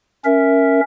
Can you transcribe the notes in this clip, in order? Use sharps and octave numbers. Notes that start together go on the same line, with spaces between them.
C#4 A#4 E5